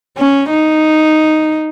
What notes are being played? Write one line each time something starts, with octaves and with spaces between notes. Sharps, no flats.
C#4
D#4